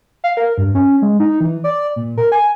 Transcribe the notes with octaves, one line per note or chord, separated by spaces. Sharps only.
F5
A#4
G2
C#4
G#3
D#4
E3
D5
A#2
A#4
G#5